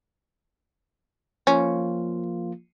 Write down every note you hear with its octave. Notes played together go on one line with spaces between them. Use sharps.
F3 A#3 C#4 F4